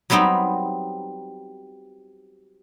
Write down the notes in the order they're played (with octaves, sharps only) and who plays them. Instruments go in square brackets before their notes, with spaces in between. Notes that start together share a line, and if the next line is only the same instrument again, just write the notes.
[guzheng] F#3 G3 B3 C4 D#4